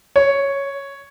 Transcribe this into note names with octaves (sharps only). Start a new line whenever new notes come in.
C#5